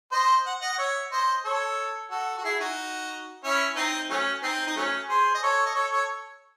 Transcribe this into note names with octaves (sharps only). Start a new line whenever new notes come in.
C5 D#5
F#5
D#5 F#5
F#5
C#5 E5
C5 D#5
A4 C#5
F#4 A4
F#4
E4 G#4
D#4 F#4
C#4 E4
C4 D#4
F#3 A3 C#4
C4 D#4
D#4
F#3 A3 C#4
G#4 C5
D#5
A4 C#5
D#5
A4 C#5
A4 C#5